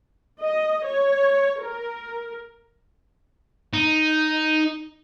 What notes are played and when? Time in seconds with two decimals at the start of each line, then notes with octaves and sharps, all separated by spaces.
0.41 D#5
0.86 C#5
1.63 A#4
3.74 D#4